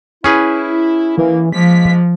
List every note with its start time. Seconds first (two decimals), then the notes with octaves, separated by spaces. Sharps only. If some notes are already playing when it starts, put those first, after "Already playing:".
0.24 C#4 E4 G#4 B4
1.17 E3 A#3
1.53 F3 G#3 A#3 B6